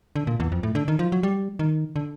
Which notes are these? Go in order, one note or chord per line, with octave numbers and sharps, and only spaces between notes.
D3
A#2
E2
F2
A2
D3
D#3
F3
F#3
G3
D#3
D3